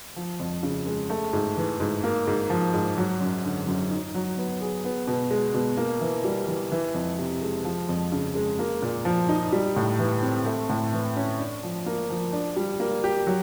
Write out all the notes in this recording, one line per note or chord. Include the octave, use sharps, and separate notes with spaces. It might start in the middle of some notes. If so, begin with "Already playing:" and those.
F3
F2
C#3
G#3
A3
G#2
E3
G#2
A#3
G#2
F3
G#2
F#3
F#2
D3
F#2
D#4
F#3
B3
G#4
B3
B2
G#3
B2
A#3
E3
G3
E3
E3
F2
C3
G#3
F3
F2
C#3
G#3
A#3
A#2
F3
D#4
G3
A2
E3
C4
A3
A2
E3
C#4
D4
F3
A#3
F3
D4
G3
A#3
G4
F#3